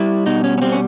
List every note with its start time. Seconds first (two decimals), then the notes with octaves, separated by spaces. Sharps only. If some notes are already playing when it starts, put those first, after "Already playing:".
Already playing: G3 E4
0.26 B2 D#4
0.44 C#4
0.58 C#4
0.62 G3 C4
0.72 C#4